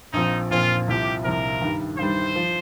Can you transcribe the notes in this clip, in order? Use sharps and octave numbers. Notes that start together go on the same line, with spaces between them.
A#1 A#2 F3 C4 D#4
A#1 A#2 F3 C4 F4
C2 C3 F3 G4
C2 C3 F3 A#4
G2 D#3 G3
G2 D#3 G3 C5
F3